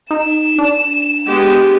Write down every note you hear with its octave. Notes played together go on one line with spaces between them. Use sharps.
D#4 E7
D4
G#3 B3 G4